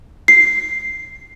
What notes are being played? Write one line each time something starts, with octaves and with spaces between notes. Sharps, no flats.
C7